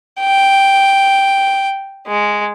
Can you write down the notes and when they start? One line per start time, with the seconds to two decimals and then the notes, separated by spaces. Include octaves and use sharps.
0.20 G5
2.07 G#3